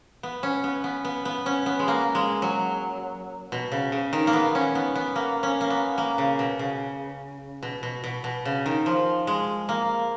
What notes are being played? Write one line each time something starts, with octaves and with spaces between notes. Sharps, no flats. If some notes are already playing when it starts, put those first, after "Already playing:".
B3
C#4
B3
B3
B3
B3
C#4
B3
G#3
A#3
G#3
F#3
B2
C#3
C#3
D#3
A#3
B3
C#4
B3
B3
A#3
C#4
A#3
B3
A#3
C#3
B2
C#3
B2
B2
B2
B2
C#3
D#3
F3
G#3
A#3